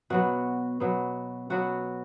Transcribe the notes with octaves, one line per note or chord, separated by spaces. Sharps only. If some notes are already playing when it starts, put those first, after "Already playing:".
B2 F#3 B3 F#4
B2 F#3 B3
B2 F#3 B3 F#4